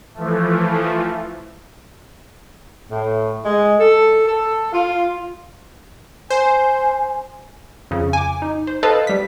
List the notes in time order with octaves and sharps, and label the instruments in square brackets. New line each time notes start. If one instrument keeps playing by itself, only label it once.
[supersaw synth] E3 F3 A3
[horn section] A2
G#3
A4
A4
F4
[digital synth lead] C5 [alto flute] G#5
[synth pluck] F2 C#3
G#5 D6
D#4
C5
A4 B4 C5 D#5 F5 A5
G3 B6